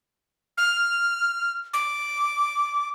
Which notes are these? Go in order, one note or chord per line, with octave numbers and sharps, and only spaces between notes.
F6
D6